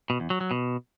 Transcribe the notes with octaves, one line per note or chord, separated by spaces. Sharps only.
B2
E2
F#3
F#3
B2